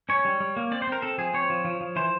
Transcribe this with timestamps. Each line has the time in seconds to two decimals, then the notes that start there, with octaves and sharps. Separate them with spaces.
0.09 C#4 C#5
0.25 G3
0.40 G3
0.56 A#3
0.71 C4 D5
0.82 C5
0.87 C4 A#4
1.02 C4 A4
1.18 F3 G#4
1.34 C4 C#5
1.50 F3
1.65 F3
1.81 F3
1.96 E3 C5